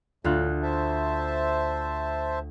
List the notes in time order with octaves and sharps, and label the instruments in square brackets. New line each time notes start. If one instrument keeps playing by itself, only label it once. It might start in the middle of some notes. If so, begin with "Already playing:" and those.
[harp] D2 F4 F#6 [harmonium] A2
[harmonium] C5 E5 A5